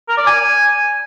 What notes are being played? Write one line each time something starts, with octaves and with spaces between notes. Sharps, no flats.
A#4
D5
G#5